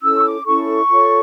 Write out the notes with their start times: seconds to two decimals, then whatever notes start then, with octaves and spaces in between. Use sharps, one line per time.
0.01 C#4 E4 A4 E6
0.17 C#6
0.23 D6
0.44 C#4 E4 A4 C#6
0.89 F4 A4 C#5